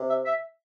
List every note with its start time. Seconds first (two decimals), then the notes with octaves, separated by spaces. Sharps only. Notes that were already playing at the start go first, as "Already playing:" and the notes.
Already playing: C3
0.09 E5
0.25 E5